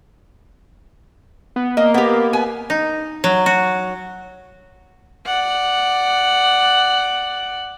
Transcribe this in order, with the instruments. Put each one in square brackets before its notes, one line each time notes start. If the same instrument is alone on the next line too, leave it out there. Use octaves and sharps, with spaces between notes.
[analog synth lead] B3
[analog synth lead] A#3 [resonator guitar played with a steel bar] D#5
[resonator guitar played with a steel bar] B3 G4
B3 G#5
[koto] D#4
F#3
F#4
[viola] D5 F#5